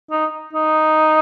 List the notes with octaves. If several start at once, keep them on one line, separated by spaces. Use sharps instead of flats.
D#4
D#4